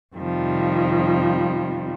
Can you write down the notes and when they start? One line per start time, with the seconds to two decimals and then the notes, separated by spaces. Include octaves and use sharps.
0.16 F2 C3 D#3 F3 G3